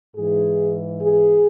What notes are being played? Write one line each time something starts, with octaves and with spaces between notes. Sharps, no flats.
G#2 E3 G#4
G#4